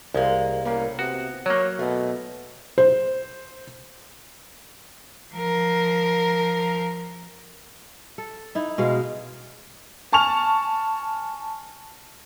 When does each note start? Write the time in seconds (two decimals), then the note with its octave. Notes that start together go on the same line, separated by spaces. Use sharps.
0.15 C2 G#3 A#3
0.65 A2 A#3 C#4
0.99 C3 B3 F#4
1.46 F#3 A#3 C#5
1.79 B2 A3
2.78 C5
5.35 F3 A#4
8.18 A4
8.55 D#4 E4
8.78 B2 G#3 F5
10.13 G#5 A5 C#6 F6 F7